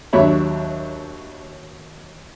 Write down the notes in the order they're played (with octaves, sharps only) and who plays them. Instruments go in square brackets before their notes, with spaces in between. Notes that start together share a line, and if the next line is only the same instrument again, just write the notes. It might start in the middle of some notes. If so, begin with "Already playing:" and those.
[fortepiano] D#2 F#3 D4 C#5 E5 B5